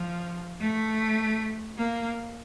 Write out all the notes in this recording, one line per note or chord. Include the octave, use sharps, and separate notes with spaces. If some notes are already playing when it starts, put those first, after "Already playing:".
Already playing: F3
A3
A#3